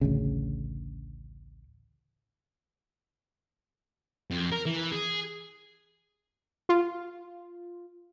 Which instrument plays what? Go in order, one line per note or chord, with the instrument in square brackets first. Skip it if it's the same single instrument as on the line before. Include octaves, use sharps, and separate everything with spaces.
[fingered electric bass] A1 D2 C#3
[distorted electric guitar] F2
A#4
E3
G#4
[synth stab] F4